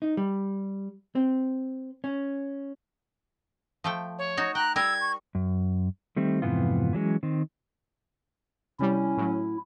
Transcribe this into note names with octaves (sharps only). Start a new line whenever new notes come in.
D#4
G3
C4
C#4
F3 A3 G5
C#5
D#4 F#4
G5 A#5 F#6
G3 A#4 E6 G#6
C#6
F#2
D#3 G3 A3 C4
F2 G#2 C3 E3 B3 F4
E3 F#3 G#3 C#4
D#3 C4
C3 G3 C#4 E4
A2 F#3